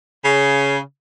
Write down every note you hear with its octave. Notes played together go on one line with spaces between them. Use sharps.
C#3